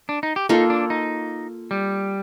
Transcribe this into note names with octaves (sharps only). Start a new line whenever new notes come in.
D4
D#4
G4
A#3 D#4 F4 A4
D4
D#4
G3